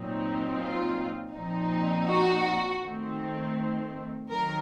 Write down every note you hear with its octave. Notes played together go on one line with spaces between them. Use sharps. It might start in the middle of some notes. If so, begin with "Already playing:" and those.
Already playing: A#2 F#3 C4 D#4
F4
A#2 F3 C4 D#4
F#4
D#3 A3 C4
D#3 F#3 A#4